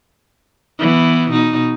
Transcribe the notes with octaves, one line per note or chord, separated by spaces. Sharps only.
E3 B3
B2 D#4